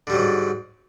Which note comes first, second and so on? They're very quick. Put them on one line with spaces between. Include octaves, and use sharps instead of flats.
D3 G3 F#3 G#2